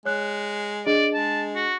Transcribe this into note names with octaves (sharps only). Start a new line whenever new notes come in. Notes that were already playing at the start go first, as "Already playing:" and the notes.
G#3 C#5 F#6
D4 G#4 D5 D#5
G#3 A5
F#4